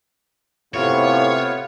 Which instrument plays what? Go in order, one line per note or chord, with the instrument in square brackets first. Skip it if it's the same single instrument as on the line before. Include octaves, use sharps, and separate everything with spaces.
[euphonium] A2 [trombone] C3 [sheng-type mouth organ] B3 F4 [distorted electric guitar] C#5